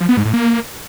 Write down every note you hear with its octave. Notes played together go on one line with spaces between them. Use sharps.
F3
B3
G#2
A2
A#3